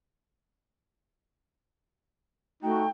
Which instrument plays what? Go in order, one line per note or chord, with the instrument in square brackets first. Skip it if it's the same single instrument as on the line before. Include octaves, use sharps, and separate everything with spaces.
[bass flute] A3 [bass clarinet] D#4 [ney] F#4 [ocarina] G5